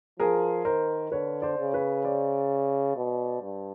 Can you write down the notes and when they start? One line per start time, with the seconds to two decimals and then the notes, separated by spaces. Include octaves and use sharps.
0.19 F3 G#4 A#4
0.65 D#3 A#4 C5
1.11 D3 B4 C#5
1.42 C5 D5
1.58 C#3
1.73 B4 C#5
2.04 C5 D5
2.97 B2
3.42 G2